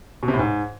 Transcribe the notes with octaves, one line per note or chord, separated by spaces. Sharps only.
B2
C3
A2
G#2